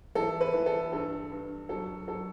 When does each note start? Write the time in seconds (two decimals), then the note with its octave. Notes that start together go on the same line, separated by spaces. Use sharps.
0.15 E3 A4
0.41 B4
0.53 E3
0.66 A4
0.92 G2 A4
1.31 G2
1.69 F#3 A4
2.08 F#3 A4